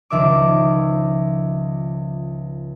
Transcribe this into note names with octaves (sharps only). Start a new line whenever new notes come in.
C#2 D#3 F3 E5 D6